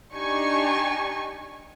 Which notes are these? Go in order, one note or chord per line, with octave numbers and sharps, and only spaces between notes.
D4 D#4 G4 G#5 C#6